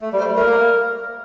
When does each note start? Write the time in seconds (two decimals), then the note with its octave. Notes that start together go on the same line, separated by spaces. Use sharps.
0.01 A3
0.13 G3
0.18 A3 C5
0.24 G3
0.35 A3 A#4
0.46 A#3